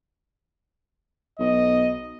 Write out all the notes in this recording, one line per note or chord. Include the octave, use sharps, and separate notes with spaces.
B1 D#5